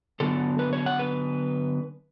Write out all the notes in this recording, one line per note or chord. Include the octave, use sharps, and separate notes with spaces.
D3 F#3 B3 D4 A4
B4
C#5
F#5
B4